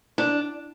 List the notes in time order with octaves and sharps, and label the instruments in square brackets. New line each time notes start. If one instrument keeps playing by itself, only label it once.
[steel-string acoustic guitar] D4